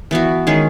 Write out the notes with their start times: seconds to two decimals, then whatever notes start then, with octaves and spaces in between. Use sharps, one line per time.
0.11 E3 B3 F#4
0.47 D#3 G#3 C#4 G#4